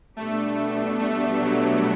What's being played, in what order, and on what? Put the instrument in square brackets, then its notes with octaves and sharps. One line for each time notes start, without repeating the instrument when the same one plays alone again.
[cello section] B2 G3 B3 D4 G4 [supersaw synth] A3
[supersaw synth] A3
F#3